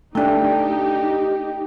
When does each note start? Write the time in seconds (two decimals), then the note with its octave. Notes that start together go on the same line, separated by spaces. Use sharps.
0.15 A3 D4 D#4 G4 G5